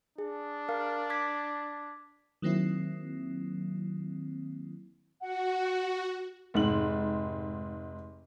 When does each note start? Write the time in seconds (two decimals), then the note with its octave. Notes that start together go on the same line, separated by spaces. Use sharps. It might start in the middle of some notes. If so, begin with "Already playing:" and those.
0.18 D4 G#4
0.69 A#4 F5
1.10 D6 G#6 B6
2.42 D#3 F#3 A#3 C4 E4
5.21 F#4 F#5
6.54 F1 G#2 F#7